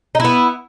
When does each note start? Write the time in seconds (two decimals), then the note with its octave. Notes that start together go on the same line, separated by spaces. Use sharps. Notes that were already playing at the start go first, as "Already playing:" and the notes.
0.15 D#4
0.20 E4
0.25 B3